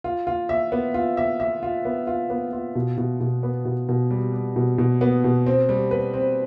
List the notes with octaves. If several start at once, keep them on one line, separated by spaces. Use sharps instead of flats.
F4
F4
E5
B3
F4
E5
E5
F4
B3
F4
B3
F4
B2
B2
B2
B3
B2
B2
G3
G3
B2
B2
B3
B2
C4
G3
B4
C4